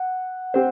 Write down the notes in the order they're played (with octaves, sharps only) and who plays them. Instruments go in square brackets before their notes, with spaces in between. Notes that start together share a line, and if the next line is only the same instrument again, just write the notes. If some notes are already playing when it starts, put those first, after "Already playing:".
Already playing: [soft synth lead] F#5
[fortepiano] C4 G4 C5